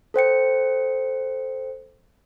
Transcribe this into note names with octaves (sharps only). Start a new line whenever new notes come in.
A4 C5 G5 C#7